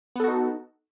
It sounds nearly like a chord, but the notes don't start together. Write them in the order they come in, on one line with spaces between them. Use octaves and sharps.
B3 A4 F#4 D#4